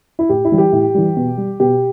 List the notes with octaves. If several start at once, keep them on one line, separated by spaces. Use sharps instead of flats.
E4
A2 G4
E4
E3 G3
G4
A2
E3 G3
B2
G3
B2 G4